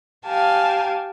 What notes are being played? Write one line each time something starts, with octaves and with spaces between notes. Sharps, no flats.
G4 F5 G#5 A5